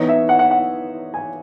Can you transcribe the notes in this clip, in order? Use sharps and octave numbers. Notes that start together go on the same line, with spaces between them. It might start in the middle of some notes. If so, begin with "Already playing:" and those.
Already playing: E3 B3 D#4 C#5
E5
F#5
F#5
F#5
G#5